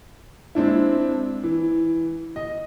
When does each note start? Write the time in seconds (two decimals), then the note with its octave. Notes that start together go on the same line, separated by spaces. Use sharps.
0.55 G#3 C4 D4 E4
1.43 E3
2.36 D#5